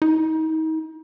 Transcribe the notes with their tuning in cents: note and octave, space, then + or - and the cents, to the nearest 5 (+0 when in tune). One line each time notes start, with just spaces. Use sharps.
D#4 +35